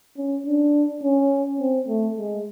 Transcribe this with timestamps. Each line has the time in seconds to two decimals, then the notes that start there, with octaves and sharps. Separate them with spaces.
0.17 C#4
0.46 D4
1.03 C#4
1.60 C4
1.88 A3
2.18 G#3